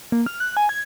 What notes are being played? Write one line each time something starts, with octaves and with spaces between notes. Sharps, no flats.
A#3
F6
F#6
G#5
G#6